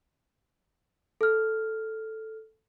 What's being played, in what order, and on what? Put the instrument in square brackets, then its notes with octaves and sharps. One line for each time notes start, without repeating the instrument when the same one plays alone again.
[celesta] A4 F6